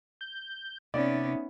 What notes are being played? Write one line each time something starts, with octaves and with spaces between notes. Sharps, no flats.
G6
C3 B3 C#4 D#4 D5 E5